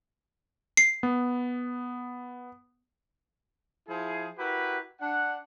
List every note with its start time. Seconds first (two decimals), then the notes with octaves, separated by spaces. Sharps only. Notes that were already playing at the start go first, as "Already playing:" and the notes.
0.77 C7
1.03 B3
3.88 F3 E4 G#4
4.37 E4 F#4 G4 A#4 B4
5.00 D4 F#5